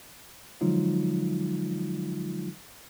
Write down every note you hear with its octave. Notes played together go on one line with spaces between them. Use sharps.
D3 F3 F#3 G#3 D#4 F4